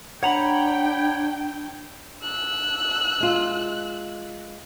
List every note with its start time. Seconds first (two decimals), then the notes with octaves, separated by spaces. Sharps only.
0.23 D4 C#5 F#5 G5 A#5 B5
2.23 E6 F#6
3.20 G#3 F4